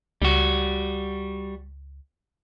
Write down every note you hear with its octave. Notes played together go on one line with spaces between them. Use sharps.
C#2 G3 F#4